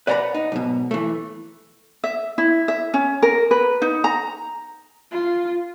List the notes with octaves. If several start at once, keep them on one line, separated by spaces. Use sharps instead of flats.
B4 D5 F#5 G#5 A#5 B5
D#4
B1 G#2 B2
E3 A3
E5
E4
E5
C#4
A#4
B4
D#4
A#5
F4